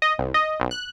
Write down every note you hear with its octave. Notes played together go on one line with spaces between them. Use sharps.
D#5
C2
D#5
B1
F#6